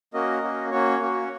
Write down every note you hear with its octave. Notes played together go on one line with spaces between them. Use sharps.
A#3 C#4 F#4 A#4 D#5
A#3 C#4 F#4
A#3 C#4 F#4 C#5
A#3 C#4 F#4